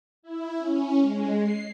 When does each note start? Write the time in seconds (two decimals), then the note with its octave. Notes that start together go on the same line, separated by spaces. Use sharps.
0.23 E4
0.58 C#4
0.99 G#3
1.40 C7